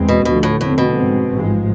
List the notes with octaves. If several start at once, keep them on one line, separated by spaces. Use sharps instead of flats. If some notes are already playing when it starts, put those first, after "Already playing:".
Already playing: E2 G#3 C4
B2
D2 B2 D3 F3 A3
A2
F1 E2 A2 D3 A3 C4
B2
G#2 G#3 C4
A1 G#2 F3 G#3